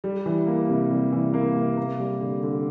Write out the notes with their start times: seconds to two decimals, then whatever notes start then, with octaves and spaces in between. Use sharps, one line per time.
0.04 G3
0.26 E3
0.47 A#3
0.69 C3
0.90 G3
1.12 E3
1.34 A#3
1.56 C3
1.77 A#3
1.99 G3
2.21 D3
2.43 D3